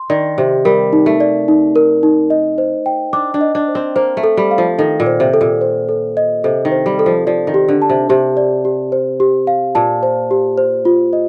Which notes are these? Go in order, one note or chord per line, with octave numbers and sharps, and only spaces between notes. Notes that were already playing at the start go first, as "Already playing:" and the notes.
Already playing: C6
D#3 D5
C3 G4
G3 A#4
D#4
A3
D5
D#4
A#4
D#4
D#5
C5
G5
D4 D6
D4
D#5
D4
C5
C4
A#3 C5
A3
A4
G3
F5
F3
D#3 A4
A#2
C5
C3
A4
A#2
C5
A4
D#5
C3 A4
D#3
C5
G3
A4
F3
F3 D5
D#3
G4
D3
A5
C3
C3 G4
D5
G4
C5
G4
F5
A#2 A5
C5
G4
C5
F4
D#5